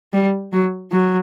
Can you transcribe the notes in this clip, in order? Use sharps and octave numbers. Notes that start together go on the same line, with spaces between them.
G3
F#3
F#3